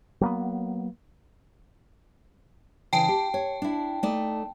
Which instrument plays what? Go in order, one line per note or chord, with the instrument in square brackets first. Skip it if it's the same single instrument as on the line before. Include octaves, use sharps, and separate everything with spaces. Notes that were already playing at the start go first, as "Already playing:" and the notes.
[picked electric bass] F#3 A#3 B3
[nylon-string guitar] C#3 E3 [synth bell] G5 A5
[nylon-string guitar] G4
C#5
D4 E4
A3 D#4 D5